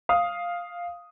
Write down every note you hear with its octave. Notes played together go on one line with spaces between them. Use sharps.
F5 D#6